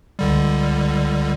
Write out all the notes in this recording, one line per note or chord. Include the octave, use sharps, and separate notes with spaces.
C#2 D3 G3